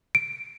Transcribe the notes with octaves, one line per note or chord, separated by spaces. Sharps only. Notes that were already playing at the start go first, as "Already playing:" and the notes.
D7